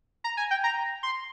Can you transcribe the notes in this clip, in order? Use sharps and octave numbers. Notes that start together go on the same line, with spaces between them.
A#5
G#5
G5
A#5
C6